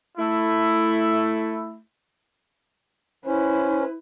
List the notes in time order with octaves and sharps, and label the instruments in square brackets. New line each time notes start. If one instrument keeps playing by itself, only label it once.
[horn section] A3 E4
[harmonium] C#4 [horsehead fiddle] E4 B4 [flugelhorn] C5